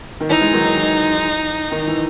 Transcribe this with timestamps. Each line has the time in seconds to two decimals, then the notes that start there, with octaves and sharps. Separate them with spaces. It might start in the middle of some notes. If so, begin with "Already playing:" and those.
0.20 D#3
0.30 E3 D#4
0.41 E3 G#3
0.53 D#3 F#3
0.65 D#3
0.77 E3
1.71 D#3
1.87 E3